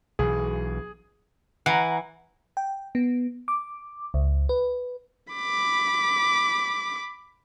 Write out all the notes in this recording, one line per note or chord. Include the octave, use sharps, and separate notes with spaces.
B1 E3 G#4
E3 F#5 A#5
G5
B3
D6
C#2
B4
B5 D6